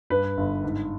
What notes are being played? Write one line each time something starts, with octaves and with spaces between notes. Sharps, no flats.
G2 B4
G1
G#2